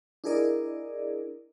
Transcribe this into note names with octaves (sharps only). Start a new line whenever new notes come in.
D4 E4 G#4 A#4 D5 D#5